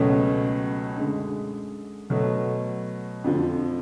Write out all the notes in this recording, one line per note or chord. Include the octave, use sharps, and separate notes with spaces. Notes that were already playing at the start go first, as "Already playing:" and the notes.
Already playing: C#2 B2 F#3 A3 C#4
F#2 D3 G#3
B2 F#3 A3
F2 D3 F3